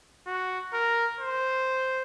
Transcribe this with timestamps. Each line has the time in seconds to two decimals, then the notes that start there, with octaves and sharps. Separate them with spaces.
0.27 F#4
0.73 A#4
1.20 C5